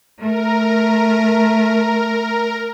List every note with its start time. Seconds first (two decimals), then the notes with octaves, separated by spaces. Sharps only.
0.19 A3 A#4